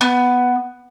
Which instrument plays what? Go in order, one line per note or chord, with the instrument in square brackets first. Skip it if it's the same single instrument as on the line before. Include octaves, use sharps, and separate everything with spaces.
[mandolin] B3